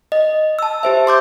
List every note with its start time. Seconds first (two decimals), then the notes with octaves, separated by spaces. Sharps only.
0.12 D#5
0.59 A5 E6
0.83 G4 C5 E5
1.07 C6 D6 G6